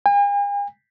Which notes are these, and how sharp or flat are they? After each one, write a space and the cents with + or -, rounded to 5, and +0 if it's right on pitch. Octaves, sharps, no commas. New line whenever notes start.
G#5 -45